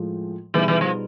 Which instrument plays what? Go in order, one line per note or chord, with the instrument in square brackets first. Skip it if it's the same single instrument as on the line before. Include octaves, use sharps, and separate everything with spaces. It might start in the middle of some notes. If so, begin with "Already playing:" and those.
Already playing: [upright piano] A2 F3 G#3
[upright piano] B2 G3 B3 D#4 G#4 [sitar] E3
[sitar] E3
F3